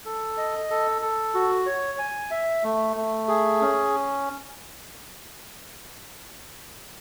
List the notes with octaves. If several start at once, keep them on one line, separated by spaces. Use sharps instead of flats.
A4
D#5
A4
A4
F#4
C#5
G#5
E5
A3
A3
G#4
C#4